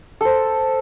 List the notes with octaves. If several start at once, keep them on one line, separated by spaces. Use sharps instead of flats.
A4 C5